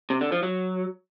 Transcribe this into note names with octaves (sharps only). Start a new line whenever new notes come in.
C3
D3
F3
F#3